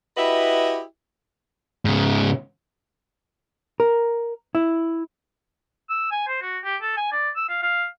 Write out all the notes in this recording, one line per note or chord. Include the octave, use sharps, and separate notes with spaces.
E4 F#4 G4 B4 D#5 E5
G#2 C#3
A#4
E4
E6
G#5
C5
F#4
G4
A4
G#5
D5
E6
F5
F5